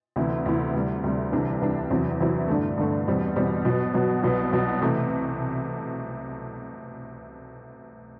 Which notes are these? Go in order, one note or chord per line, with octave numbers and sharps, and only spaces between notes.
D2 C3 E3 B3 E4
D2 C3 E3 B3 E4
D2 C3 G3
D2 C3 G3
C2 C3 E3 G3 D4
C2 C3 E3 G3 D4
E2 C3 F#3 C4 E4
E2 C3 F#3 C4 E4
G2 D3 A3
G2 D3 A3
E2 B2 G3 C4
E2 B2 G3 C4
B2 F#3 B3
B2 F#3 B3
C2 B2 F#3 B3
C2 B2 F#3 B3
C3 E3 A3